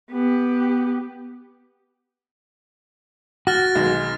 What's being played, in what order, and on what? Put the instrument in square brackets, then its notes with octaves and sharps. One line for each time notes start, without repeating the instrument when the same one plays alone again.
[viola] B3 G4
[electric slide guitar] F#4 [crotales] F6 A6 A#6
[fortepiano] B1 D#3 G#3